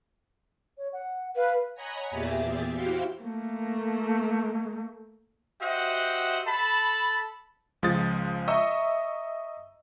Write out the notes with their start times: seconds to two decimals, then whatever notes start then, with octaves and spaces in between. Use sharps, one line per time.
0.78 C#5
0.93 F#5
1.36 B4 F5
1.75 C#5 D#5 F#5 G#5 A#5 B5
2.10 E2 A#2 G4 G#4 E5 A6
2.72 E4 F#4 G4 C5 F5 G5
3.22 A3 A#3
5.60 F#4 G4 C5 D#5 E5 F#5
6.46 A4 A5 B5
7.83 C#2 F3 G#3 D#6 A6
8.48 D#5 E5 A#5 C#6 E6